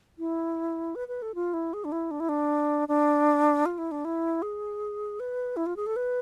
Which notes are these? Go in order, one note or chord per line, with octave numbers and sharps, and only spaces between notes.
E4
B4
B4
A4
F4
E4
G#4
D4
E4
D4
E4
D4
D4
F4
E4
D4
E4
G#4
B4
E4
F4
G#4
A4
B4